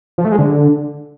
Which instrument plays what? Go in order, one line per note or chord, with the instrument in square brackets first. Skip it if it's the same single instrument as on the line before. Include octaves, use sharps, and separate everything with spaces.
[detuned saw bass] F3
A3
G#3
D3